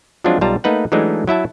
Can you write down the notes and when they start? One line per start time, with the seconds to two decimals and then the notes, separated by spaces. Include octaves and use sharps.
0.24 F3 F#3 G#3 C4 D4 F4
0.41 B1 G3 F4 A5 A#5
0.64 A3 A#3 D#4 B4 F#5
0.92 E3 F#3 G#3 A3 D4 D#4
1.27 F#3 E4 E5 A5